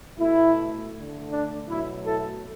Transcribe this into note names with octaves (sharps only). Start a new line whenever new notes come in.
B2 A3 E4
D3 A3
D4
B2 F#3 A3 E4
E4 A4